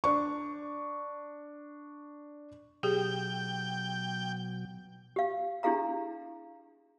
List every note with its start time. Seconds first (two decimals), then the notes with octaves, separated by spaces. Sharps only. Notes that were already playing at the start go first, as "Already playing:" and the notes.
0.04 D4 C#6
2.83 B2 F#3 G4 G#4 G5
5.16 G4 F5
5.63 D4 E4 G4 G#4 F5 A#5